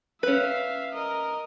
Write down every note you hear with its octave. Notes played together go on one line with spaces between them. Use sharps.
C#4 B4 E5 F5
A#4 D#5